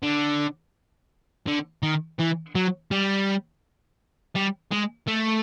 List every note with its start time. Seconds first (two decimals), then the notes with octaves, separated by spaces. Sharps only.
0.03 D3
1.47 D3
1.83 D#3
2.20 E3
2.55 F#3
2.91 G3
4.35 G3
4.71 G#3
5.07 A3